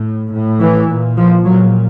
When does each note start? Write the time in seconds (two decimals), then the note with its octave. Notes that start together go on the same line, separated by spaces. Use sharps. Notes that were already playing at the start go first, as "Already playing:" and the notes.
Already playing: A2
0.32 A2
0.60 E3
0.88 A#2
1.17 F3
1.45 A#2 F#3